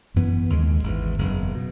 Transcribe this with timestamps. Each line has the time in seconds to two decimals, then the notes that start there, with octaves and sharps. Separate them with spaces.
0.14 G#1 F#2 E3 B3
0.50 D#2 C#3 G#3
0.84 G#1 G#2 E3
1.19 F#1 E2 B2
1.55 B2